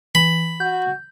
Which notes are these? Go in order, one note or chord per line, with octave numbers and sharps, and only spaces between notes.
E3 B5
F#4 G6